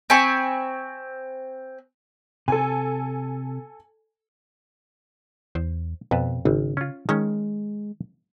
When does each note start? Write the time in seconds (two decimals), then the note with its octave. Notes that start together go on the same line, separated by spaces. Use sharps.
0.10 C4 G#5 B5 C#6
2.48 C3 A4 G#5
5.55 E2 C5
6.11 F2 B2 B4 A5
6.45 G#1 C#3
6.77 C#4 F4
7.09 D#3 G#3 C#4